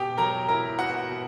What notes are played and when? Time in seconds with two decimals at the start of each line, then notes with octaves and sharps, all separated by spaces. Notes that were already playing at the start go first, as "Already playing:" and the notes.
Already playing: B2 B3 G4 G5
0.17 F#3 A#4 A#5
0.49 E4 A#4 A#5
0.78 B3 F#4 F#5
1.09 B2